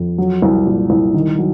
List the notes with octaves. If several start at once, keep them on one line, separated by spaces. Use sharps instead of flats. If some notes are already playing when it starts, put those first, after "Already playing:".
Already playing: F2
F#3
C2
A#2
C2
D#3
F#3